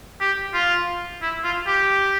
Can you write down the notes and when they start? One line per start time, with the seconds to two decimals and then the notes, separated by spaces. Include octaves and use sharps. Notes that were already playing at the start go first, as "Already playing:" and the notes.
0.21 G4
0.54 F4
1.22 E4
1.44 F4
1.66 G4